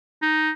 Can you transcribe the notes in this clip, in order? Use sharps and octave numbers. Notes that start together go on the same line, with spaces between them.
D#4